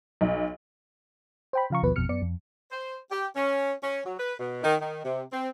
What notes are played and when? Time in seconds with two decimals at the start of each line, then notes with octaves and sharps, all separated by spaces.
0.21 B1
1.53 C5 G5 B5
1.70 C#3 F3 F5 A#5 C#6
1.83 A1 D#2 B2 F3 B4
1.96 G#1 F2 B2 F6 C#7
2.09 F#2 B3 D5 C#7
2.22 F2
2.71 C5
3.11 G4
3.36 C#4
3.83 C#4
4.05 F#3
4.18 B4
4.39 B2
4.63 D#3
4.80 D#3
5.04 C3
5.32 C4